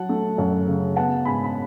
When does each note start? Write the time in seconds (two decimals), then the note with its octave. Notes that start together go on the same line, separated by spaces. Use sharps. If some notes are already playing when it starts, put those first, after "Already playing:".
Already playing: F#3 F#5 A5
0.09 A3
0.38 F#2
0.67 C#3
0.96 B3 F#5 A5
1.25 G#2 G#5 B5
1.44 B5